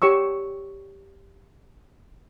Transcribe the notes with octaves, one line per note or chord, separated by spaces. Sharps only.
G4 C#5 C#6 E6